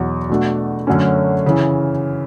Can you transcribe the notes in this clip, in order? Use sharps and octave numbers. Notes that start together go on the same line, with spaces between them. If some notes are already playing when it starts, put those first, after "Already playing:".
Already playing: E2 B2 F#3
B2 A3 D4 F#4
F#2 D3 F#3 A3 C#4
C#3 E3